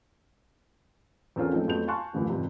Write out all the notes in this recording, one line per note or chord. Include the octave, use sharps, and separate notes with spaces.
E2 C4 C#4 F4 A4 A#4
A2 F3 G#3 C4 D#4 A4
F2 F#3 A3 B3 G6 F7
F5 G#5 A5 C6 C#6 F#6
F#1 D#2 A2 D3 E3 F3
G#1 F2 C3 E3